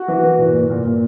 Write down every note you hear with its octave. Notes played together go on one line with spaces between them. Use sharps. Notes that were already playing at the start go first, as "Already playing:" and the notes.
Already playing: F#4
E3
E3
A#2
A#2
A#2
A#2